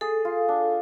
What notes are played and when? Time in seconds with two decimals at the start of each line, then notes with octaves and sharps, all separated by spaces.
0.01 G#4 A4
0.25 F4
0.48 D4